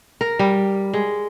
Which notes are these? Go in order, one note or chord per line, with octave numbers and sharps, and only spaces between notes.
A#4
G3
G#3